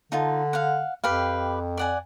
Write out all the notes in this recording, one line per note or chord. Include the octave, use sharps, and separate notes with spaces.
D3 D#4 F4 A5
F5 F#5
F2 G4 B4 F5
D5 F#5 G#5